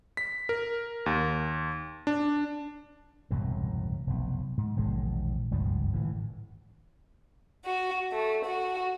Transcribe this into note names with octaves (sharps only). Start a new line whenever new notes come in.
B6
A#4
D#2
D4
E1 C2 F#2 A2
F1 B1
G#2
E1 A#1 D#3 G#3
F#1 C#2 G2 F3
G#1 A2 C3 E3
F#4
A3
F#4